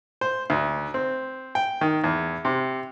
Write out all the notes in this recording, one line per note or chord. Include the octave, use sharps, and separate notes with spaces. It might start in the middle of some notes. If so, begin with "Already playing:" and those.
C5
D2
C4
G5
D#3
E2
C3